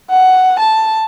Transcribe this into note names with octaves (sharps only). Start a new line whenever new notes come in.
F#5
A5